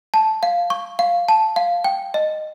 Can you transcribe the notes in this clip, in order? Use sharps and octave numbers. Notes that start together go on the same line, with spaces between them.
A5
F5
C#6
F5
A5
F5
G5
D#5